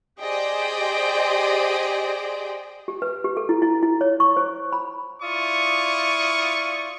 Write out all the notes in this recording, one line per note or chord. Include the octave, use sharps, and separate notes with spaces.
G4 G#4 C5 D5 D#5 G5
G4
B4
G4
A4
E4
E4
E4
C#5
C#6
C5
B5
E4 F4 D5 C#6 D#6